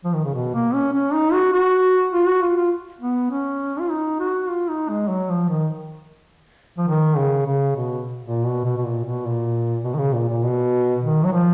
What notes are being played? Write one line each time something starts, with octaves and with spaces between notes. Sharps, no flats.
F3
D#3
C#3
B2
A#3
C#4
C#4
D#4
F#4
F#4
F4
F#4
F4
F4
B3
C#4
F4
D#4
F#4
F4
D#4
G#3
F#3
F3
D#3
F3
D#3
C#3
C#3
B2
A#2
B2
B2
B2
A#2
B2
A#2
B2
D#3
C#3
A#2
A#2
B2
D#3
F#3
F3